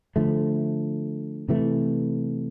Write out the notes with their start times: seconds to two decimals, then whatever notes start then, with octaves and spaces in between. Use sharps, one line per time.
0.16 D3 F3 A3
1.49 C3 E3 A3